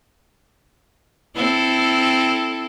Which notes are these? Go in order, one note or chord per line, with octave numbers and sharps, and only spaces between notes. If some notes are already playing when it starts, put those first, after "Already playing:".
C4 E4 A4